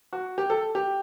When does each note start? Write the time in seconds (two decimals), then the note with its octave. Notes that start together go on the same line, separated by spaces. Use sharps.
0.13 F#4
0.38 G4
0.50 A4
0.75 G4